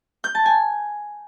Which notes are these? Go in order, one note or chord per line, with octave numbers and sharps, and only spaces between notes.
G6
A5
G#5